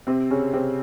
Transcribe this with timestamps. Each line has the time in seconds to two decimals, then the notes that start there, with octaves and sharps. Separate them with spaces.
0.07 C3 C4
0.30 C#3 C#4
0.53 C3 C4